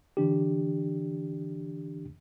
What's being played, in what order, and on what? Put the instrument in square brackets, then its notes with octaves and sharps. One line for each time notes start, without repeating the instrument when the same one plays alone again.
[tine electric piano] D3 E3 D4 G4